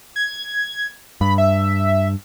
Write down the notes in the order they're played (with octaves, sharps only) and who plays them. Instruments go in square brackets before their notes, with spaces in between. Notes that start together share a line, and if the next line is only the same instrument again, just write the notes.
[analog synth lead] G#6
[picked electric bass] G2 [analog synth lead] B5
[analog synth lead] E5